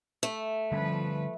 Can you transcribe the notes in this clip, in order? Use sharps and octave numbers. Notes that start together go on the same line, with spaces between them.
A3
D3 F3 G3 C#4 B4